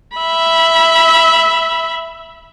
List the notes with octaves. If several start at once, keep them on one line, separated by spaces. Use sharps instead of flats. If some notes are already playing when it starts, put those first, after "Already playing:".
E5 B5